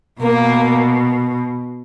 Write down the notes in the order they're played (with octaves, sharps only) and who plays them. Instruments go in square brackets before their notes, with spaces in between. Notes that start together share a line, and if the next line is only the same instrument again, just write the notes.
[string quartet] B2 A#3